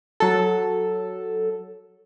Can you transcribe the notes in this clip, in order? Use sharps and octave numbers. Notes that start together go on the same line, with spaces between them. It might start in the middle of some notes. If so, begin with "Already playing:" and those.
F#3 A4